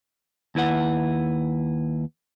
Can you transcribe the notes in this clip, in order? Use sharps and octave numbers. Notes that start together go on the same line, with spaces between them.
D#2 E4 B4 F#5